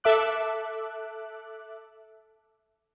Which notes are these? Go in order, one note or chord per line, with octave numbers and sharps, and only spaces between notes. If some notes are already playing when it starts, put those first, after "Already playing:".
A4 E5 D6 F#6